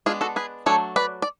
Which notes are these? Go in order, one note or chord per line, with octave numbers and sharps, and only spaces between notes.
G#3 B3 D4 F4 G#4
F#4 A4
G#4 B4
F#3 A3 D4 A4 C#5
B4 D5
D5